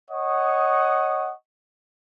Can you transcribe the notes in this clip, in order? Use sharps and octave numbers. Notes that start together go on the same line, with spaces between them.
C#5 D#5 F#5 C#6 D#6